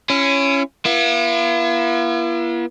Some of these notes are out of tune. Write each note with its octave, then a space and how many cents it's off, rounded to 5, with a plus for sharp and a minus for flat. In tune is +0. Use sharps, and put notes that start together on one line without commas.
C#4 +0 E4 +40
B3 -45 E4 +45